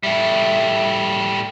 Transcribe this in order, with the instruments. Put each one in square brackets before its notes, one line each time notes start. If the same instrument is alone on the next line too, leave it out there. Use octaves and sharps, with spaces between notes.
[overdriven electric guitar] A2 G3 [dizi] E5